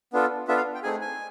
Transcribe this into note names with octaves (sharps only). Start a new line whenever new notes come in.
B3 D4 F4 A4
B3 D4 F4 A4 E5
F5
G5
A3 C4 D#4 G#4 G#5
G#5